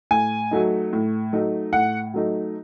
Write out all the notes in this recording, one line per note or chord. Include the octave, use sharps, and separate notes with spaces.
A2 G#5
F#3 A3 D#4
A2
F#3 A3 D#4
A2 F#5
F#3 A3 D#4